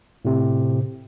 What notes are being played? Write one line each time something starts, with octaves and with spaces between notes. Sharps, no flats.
A2 C3